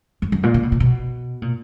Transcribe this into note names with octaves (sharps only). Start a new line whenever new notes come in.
F#2
F#2
A#2
C#3
B2
A#2
B2
A#2